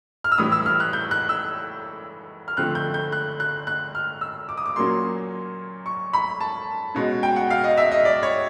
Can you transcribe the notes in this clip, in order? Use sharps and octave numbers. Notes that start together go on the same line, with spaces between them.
F6
E6
A2 E3 G3 D#6
E6
F6
F#6
G6
F#6
E6
F6
D3 F3 A3 C4 F#6
G6
G6
F#6
F#6
F#6
F6
E6
D6
D#6
D6
A#2 F#3 A#3 C#4 C6
C#6
B5
A5
B2 G#3 C#4
G5
F#5
F5
D#5
E5
D#5
D5
C#5